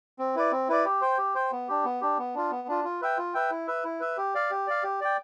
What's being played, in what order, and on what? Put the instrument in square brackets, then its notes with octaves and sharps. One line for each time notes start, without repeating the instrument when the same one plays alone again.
[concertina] C4
E4 B4 D5
C4
E4 B4 D5
G4
C5 G5
G4
C5 G5
B3
D4 G4
B3
D4 G4
B3
D4 F4
B3
D4 F4
F4
B4 E5 G5
F4
B4 E5 G5
E4
B4 E5
E4
B4 E5
G4
D5 F5
G4
D5 F5
G4
D5 G5